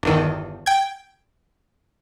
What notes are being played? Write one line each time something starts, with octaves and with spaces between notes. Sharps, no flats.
G1 E2 D#3
G5 G#6